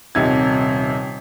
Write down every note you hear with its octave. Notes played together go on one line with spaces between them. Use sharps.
D#1 C3 D#4 G#6